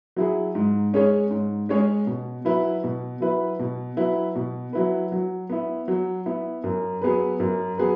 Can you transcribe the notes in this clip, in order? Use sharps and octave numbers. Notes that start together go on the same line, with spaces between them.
F#3 E4 G#4
G#2
G#3 C#4 G#4 C#5
G#2
G#3 C#4 G#4 C#5
B2
F#3 E4 B4
B2
F#3 E4 B4
B2
F#3 E4 B4
B2
F#3 E4 B4
F#3
B3 E4
F#3
B3 E4
F#2
F#3 B3 G#4 B4
F#2
F#3 B3 G#4 B4